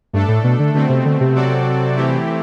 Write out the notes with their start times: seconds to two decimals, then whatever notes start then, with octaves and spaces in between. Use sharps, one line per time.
0.13 G2 A3 D4 A4
0.28 A2
0.44 B2
0.59 D3
0.74 B2 D3 A3 C4
0.89 C3
1.05 D3
1.21 C3
1.35 F#3 C4 F#4 A4 D5
1.96 E3 A3 C4 E4 G4